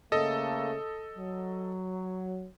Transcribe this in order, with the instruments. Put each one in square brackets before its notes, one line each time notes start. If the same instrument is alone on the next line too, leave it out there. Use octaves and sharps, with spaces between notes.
[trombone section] C#3 A3 A#3 [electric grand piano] A4 D#5
[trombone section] F#3